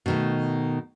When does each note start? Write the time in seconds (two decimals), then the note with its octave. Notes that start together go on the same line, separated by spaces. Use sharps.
0.06 B2 D#3 A3